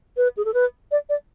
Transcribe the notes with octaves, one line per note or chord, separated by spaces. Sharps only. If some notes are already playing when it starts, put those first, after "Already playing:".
B4
G#4
A4
B4
D5
D5